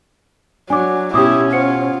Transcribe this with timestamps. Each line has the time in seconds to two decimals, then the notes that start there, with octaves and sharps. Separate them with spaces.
0.70 F#3 D4 G#5 D6
1.14 B2 C#4 E4 G4 D6 D#6
1.53 F4 C5 F#5 C#7